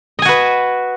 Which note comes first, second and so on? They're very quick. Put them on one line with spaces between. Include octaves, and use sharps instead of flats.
D#5 G#5 F#4 B4